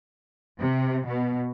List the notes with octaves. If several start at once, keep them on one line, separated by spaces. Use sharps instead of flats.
C3
B2